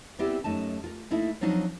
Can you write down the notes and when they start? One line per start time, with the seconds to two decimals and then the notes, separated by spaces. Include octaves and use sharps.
0.19 G3 B3 C4 E4 G4
0.44 F#2 A3 D#4 A5
0.84 F4 A#4
1.11 A3 A#3 D#4 E4 A4
1.41 F3 F#3 C4 D4 D#4 F4